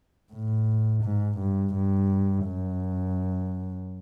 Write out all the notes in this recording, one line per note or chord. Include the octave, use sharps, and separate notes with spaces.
A2
G#2
G2
G2
F#2